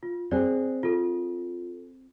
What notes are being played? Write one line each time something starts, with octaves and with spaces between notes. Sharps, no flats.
F4
C4 G#4 C5 D5
F4 A4